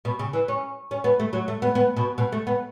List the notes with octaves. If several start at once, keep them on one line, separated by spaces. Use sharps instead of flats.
B2
C#3
E3
C#4
C#4
B3
A3
F#3
A3
B3
B3
B2
B2
A3
B3